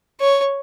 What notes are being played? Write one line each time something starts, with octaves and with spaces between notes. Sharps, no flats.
C#5